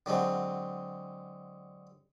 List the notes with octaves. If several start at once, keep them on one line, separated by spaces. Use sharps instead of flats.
D3 F#3 G#3 C4